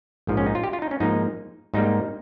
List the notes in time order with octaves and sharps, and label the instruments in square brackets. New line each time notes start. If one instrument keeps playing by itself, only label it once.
[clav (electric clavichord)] A#1 G#2 F3
C#4
D#4
F4
G4
F4
D#4
C#4
G#2 F3 A#3 D#4
G#2 G3 A#3 D#4